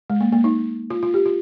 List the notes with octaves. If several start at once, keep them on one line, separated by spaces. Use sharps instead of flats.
G#3
A#3
A#3
D#4
F4
F4
G4
F4